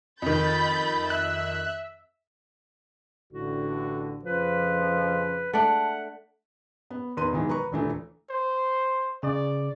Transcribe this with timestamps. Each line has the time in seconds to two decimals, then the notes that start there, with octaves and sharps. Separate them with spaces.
0.22 F2 D#3 B5 G6 A6
1.10 E5 F#6
3.33 A1 A2 D3 F#4
4.25 F2 C#3 F3 B4
5.53 A3 D4 F#5
6.90 B3
7.17 E2 D#3 B4 C6 D#7
7.32 G#2 B2 D#3 E3 F#3
7.49 B4 A#5 C#6
7.72 D#1 D3 E3 A3
8.30 C5
9.23 C#3 D5